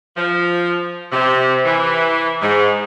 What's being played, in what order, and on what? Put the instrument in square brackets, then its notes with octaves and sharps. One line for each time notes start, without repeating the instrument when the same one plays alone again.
[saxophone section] F3
C3
E3
G#2